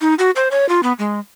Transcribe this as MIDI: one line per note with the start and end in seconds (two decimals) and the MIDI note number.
0.01 0.14 63
0.19 0.31 66
0.36 0.48 72
0.51 0.68 73
0.69 0.81 65
0.83 0.93 59
0.99 1.20 56